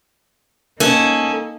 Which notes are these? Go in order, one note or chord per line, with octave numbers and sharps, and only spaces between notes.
A#3 C#4 D#4 A4